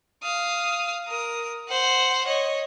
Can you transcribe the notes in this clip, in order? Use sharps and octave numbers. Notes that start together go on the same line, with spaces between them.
F5 D#6
A#4 D#6
C5 F#5
C#5 D#5